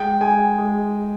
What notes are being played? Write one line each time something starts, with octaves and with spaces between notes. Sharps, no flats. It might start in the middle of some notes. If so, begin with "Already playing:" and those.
Already playing: G#3 G5
G#3 G#5
G#3